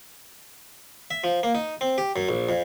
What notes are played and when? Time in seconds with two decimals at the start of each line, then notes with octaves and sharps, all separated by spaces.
1.11 E5
1.24 F3
1.43 A#3
1.55 D#4
1.81 C4
1.98 G4
2.16 F#2
2.29 A#1
2.49 F2